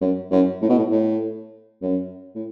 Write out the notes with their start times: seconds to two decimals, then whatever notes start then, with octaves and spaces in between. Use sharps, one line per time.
0.01 F#2
0.31 F#2
0.62 A2
0.70 B2
0.78 A2
0.91 A2
1.82 F#2
2.35 A2